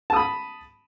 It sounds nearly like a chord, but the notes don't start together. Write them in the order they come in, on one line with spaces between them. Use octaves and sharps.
A5 D#6 B5